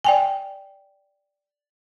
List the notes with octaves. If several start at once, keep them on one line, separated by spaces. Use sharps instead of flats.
D5 G5 G#5